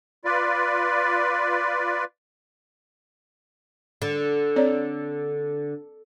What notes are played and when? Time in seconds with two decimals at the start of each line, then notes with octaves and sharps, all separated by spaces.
0.25 F4 B4 D5
4.02 D3
4.56 C4 C#5 D5